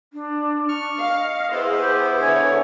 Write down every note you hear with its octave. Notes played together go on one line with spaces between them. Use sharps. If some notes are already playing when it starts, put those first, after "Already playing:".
D4
D4 C#6 F6
D#5 F5
B3 E4 G#4 B4 C5
G4
D3 C#5 E5 G#5